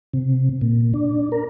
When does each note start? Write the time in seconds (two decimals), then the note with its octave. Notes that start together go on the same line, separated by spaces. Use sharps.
0.13 C3
0.61 A#2
0.94 D4
1.32 A#4